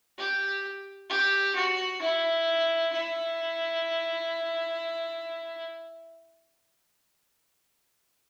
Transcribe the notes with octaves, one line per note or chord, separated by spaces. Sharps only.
G4
G4
F#4
E4
E4